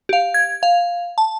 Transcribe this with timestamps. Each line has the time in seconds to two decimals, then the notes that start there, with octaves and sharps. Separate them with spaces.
0.09 G4 F5
0.34 G#6
0.63 F5
1.18 A5